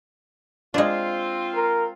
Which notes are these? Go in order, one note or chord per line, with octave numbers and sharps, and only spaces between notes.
G#3 C4 D4 F4
A#4